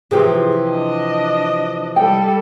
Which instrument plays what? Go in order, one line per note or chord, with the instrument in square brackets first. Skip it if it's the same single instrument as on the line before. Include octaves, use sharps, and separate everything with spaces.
[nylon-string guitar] C3 E3 F3 [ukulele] F4 G4 G#4
[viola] D4 D#5
[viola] G3 A4 [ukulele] G5